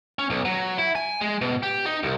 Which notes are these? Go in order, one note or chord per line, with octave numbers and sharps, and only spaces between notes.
C#4
B1
F#3
E4
G#5
G#3
B2
G4
D#4
C2